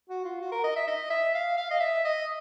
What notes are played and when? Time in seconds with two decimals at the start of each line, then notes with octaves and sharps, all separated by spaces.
0.10 F#4
0.25 F4
0.41 F#4
0.52 A#4
0.64 D#5
0.76 E5
0.88 D#5
1.10 E5
1.35 F5
1.57 F5
1.71 D#5
1.80 E5
2.05 D#5